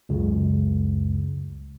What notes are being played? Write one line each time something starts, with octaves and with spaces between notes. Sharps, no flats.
C#2 F#2 C#3